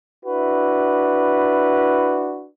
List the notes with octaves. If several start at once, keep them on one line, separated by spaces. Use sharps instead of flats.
D4 E4 F#4 B4